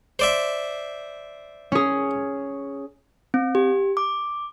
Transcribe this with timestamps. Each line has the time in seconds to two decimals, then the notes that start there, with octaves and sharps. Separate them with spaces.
0.19 C5 D5 E5
1.72 C#4 G#4
3.34 C4
3.55 G4
3.97 D6